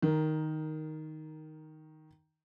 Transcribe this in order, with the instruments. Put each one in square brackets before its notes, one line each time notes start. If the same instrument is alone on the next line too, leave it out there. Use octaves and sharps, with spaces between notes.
[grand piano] D#3 A#4